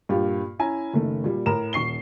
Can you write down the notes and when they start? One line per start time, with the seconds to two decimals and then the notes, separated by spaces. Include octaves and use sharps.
0.09 G2 A#2 F4 G4
0.59 C#4 E4 G#5 A#5
0.94 F#1 D#3 A3
1.24 A#2 G3
1.46 A2 A#4 A#5 E7
1.73 D#1 C#6 C7 G7